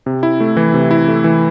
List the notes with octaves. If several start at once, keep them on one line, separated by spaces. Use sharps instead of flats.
C3
E4
A3
E3
C3
E4
A3
E3